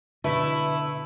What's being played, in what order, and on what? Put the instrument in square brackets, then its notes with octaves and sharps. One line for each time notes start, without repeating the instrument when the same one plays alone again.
[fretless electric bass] B2 D3 [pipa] A3 [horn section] E4 [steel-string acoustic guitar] B4